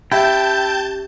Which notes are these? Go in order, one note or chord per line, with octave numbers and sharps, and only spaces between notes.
C#4 E4 G4 E5 G5 A5 G6